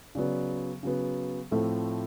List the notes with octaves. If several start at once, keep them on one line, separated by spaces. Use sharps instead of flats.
C#3 F#3 B3 D5
C#3 F#3 B3
A2 F3 A3 C4 A4